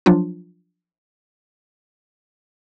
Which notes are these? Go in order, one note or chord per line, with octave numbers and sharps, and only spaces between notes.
F3 F#3 D4 F4